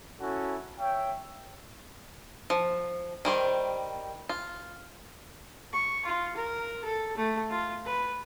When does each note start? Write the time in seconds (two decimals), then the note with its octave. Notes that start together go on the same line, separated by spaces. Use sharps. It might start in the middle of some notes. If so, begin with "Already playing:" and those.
0.20 C#4 E4 F#4 A4
0.79 C#5 E5 G5
2.50 F3
3.25 D#3 G3 C5
4.29 F4
5.73 C#6
6.05 F4
6.36 A#4
6.84 A4
7.17 A3
7.50 F4
7.85 B4